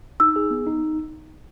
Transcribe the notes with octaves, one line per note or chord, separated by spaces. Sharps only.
D#4 E6
G#4
B3
D#4